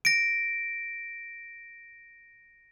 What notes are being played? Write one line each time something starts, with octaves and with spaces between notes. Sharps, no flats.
A#6 D7